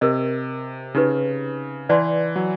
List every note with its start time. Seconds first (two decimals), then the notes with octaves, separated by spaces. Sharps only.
0.01 C3 G4 A#4 D#5
0.94 C#3 D#4 G4 B4
1.89 E3 B4 D5 F#5 A5 C6
2.36 F#3